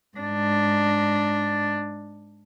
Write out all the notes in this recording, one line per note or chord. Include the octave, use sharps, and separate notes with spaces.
G#2 D4